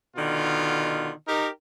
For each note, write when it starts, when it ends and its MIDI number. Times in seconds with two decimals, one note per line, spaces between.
0.17 1.11 47
0.17 1.11 50
0.17 1.11 51
0.17 1.11 65
1.28 1.48 63
1.28 1.48 67
1.28 1.48 70